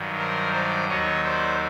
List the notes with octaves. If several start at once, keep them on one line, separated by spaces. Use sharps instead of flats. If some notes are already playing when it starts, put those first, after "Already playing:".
Already playing: G2 D#3 F#3
A#4 C5
C5 D5
D#2 D#3 F#3 C#5 D#5
C5 D5